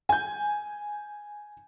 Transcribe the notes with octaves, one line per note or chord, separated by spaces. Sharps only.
G#5 G6